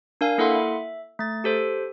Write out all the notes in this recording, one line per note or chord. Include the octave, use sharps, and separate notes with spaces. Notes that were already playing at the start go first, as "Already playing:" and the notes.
D4 A#4 F5 G#5
A#3 E4 A4 E5 F#5 C6
E5
A3 A6
G4 A4 C5